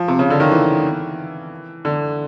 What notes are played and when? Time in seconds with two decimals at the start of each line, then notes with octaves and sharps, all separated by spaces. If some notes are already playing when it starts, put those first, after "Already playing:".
Already playing: F3
0.08 C3
0.19 C#3
0.30 D3
0.40 D#3
0.52 E3
1.85 D3